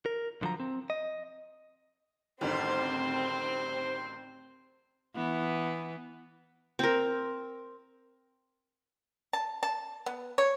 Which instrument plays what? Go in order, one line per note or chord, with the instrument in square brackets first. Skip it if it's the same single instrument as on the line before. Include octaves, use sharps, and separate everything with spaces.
[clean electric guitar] A#4
C2 D3 F3 F#3 A#5
C4
D#5
[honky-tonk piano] A1 D2 D#3 [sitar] D3 G3 [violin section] C4 [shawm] C5
[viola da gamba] E3 B3
[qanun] C4 A#4
[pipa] A5
A5
B3
C#5